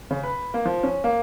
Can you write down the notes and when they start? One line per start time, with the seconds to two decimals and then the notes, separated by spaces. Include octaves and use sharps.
0.11 C#3
0.23 B4
0.54 A#3
0.65 F3
0.83 C#4
1.04 A#3